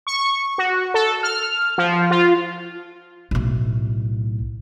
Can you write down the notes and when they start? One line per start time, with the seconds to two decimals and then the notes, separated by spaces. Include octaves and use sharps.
0.07 C#6
0.58 F#4
0.94 A4
1.23 F6
1.78 F3
2.11 F4
3.31 B1 A2